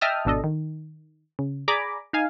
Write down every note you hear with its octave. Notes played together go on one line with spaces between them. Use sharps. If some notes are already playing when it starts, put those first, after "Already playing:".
D#5 E5 G5 A5 D#6 F6
G#1 B2 D4 A4 D#5
D#3
C#3
G#4 D5 G#5 A#5 B5 D6
D#4 F5 G#5